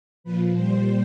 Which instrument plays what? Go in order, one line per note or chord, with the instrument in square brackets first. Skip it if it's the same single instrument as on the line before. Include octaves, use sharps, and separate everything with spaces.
[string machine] A#2 F3 B4
A#2 G3 C5